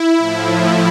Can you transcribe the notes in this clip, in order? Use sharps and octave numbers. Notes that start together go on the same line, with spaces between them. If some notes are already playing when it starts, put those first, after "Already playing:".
Already playing: E4
A2 F3